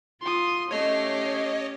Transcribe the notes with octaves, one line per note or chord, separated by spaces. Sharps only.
F4 C6 D#6
A3 C#4 G4 C#5 D#5 C7